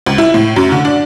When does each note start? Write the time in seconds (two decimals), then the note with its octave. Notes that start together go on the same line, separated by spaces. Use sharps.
0.06 C#2
0.18 E4
0.34 A2
0.56 F#2
0.72 D3
0.85 D4